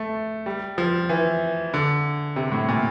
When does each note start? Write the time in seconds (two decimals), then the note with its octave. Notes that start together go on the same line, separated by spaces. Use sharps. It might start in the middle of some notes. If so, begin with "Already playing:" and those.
Already playing: A3
0.46 G3
0.78 F3
1.09 E3
1.74 D3
2.36 C3
2.52 A2
2.68 A#2